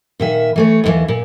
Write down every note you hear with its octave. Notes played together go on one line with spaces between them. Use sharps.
A#2 D#3 E5
E3 A3 C#5
D#2 A2 E3
A#2